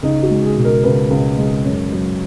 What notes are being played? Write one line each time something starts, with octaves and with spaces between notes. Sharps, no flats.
C#2 D#4
F#4
G#3
G#4
B2
A#4
C#2 B4
C#2
G#3
F#2
F#3